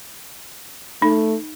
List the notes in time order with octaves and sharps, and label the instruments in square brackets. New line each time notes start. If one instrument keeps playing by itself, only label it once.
[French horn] A3 [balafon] D#4